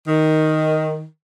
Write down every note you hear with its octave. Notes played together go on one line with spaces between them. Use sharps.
D#3